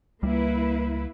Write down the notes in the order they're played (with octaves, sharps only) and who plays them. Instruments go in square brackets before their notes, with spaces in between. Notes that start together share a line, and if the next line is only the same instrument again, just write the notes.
[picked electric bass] C#2 G3 [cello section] A#3 E4 B4